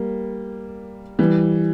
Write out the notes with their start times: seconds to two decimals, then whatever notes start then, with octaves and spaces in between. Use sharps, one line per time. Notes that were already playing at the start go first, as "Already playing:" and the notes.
Already playing: G3 A#3
1.19 E3 G3